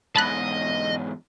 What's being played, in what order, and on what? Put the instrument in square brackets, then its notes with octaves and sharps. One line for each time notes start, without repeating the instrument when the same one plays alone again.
[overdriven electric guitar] E2 G#2 [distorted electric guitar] D#5 [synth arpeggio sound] A5 B5 F#6